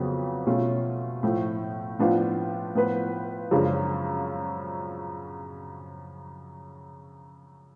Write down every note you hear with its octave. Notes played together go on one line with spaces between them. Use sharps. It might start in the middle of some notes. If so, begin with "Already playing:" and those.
Already playing: F2 C#3 F#3 B3
B2 A3 C#4 F4
A2 F3 A3
A2 F3 B3 D4 F4
A2 F3 B3 F4 B4
F#2 C#3 F3 G#3 D4